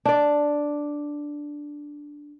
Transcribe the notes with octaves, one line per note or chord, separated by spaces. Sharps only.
D4 D5